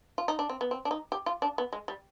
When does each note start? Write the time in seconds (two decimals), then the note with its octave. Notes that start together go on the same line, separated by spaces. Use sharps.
0.18 F4
0.28 D#4
0.39 D4
0.49 C4
0.61 B3
0.71 C4
0.85 D4
0.91 D#4
1.12 G4
1.26 F4
1.42 D4
1.58 B3
1.73 G#3
1.88 G3